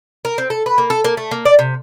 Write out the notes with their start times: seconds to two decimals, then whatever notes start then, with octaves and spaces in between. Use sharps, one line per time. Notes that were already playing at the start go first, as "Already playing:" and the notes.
0.25 A#4
0.38 C4
0.50 A4
0.66 B4
0.78 A#3
0.90 A4
1.04 A#3
1.17 A3
1.31 A#3
1.45 D5
1.59 C3